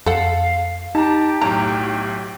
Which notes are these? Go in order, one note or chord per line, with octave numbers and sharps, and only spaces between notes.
F2 A4 F5 F#5
D#4 G4 A5 A#5
B1 A2 A#5